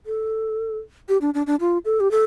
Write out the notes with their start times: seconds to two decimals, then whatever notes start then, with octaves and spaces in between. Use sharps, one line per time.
0.06 A4
1.09 G4
1.21 D4
1.34 D4
1.47 D4
1.60 F4
1.85 A4
2.00 G4
2.11 A4